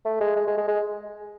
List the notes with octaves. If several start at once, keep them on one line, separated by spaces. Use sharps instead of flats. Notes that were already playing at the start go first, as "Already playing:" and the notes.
A3
G#3
G#3
G#3
G#3
G#3